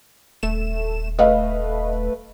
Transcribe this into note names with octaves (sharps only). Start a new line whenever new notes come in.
D#1 A3 E7
A3 B4 D#5 F5